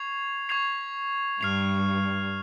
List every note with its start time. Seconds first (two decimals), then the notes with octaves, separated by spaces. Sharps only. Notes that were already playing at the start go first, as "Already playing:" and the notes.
Already playing: C#6 G#6 C7 F7
0.49 C#6 G#6 C7 F7
1.41 G2 F6 C7 F7